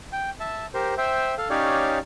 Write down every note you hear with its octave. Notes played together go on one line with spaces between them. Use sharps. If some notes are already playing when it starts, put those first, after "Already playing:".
G5
E5 A5
G4 A#4 C5
C5 E5 G5
A4 F5
C#4 D#4 G4 C#5 D5 F5